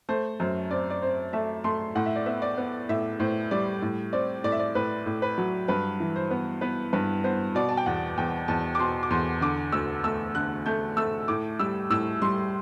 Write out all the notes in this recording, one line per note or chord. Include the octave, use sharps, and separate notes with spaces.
A3 C5
F#2 C5
C4 D5
D5
C4 C5
A3 E5
A3 C6
A2 F#5
E5
D5
B3 E5
D5
B3
A2 E5
A2 C5
G3 D5
A2
C4 D5
A2 D5
E5
D5
A2 B4
A2
B4
F#3
G2 B4
E3
C5
B3
B3 B4
G2 B4
B3 C5
B2 D5
A5
G5
E2 F#5
E2 G5
E2 A5
D6
B2 C6
D6
E2 C6
D3 D6
D2 E6
A3 E6
D3 F#6
A3 G6
A3 E6
A2 D6
G3 E6
A2 E6
G3 C6